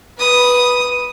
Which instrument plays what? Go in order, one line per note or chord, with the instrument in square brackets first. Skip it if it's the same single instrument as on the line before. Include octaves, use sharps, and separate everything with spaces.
[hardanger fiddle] B4 D#6